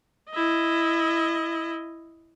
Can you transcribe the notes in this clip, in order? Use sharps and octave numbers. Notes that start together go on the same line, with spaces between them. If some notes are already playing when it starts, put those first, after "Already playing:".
E4 D#5